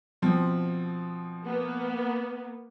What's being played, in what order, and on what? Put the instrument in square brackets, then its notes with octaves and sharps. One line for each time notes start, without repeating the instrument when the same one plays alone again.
[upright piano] B2 F3 C4
[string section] A#3 B3